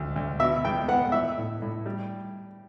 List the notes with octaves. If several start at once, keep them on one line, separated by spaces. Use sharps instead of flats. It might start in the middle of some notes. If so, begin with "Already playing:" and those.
Already playing: D2
D2
B2 E5
E2 G5
B3 F#5
E3 E5
A2
A2
G3